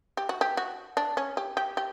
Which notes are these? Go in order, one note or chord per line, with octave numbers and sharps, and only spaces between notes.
G4
F#4
G4
F#4
D4
C#4
G4
G4
G4